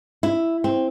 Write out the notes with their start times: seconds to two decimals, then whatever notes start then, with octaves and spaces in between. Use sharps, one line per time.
0.23 E4
0.64 C4